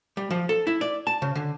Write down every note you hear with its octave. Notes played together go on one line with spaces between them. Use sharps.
G3
F3
A4
E4
D5
A5
C#3
D3